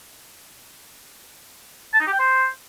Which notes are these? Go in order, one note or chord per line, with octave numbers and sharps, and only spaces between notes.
A5
D#4
G4
G5
C5